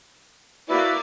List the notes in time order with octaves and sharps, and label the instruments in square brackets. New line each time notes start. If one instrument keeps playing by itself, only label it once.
[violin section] A#3 D5 [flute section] E4 F#4 B4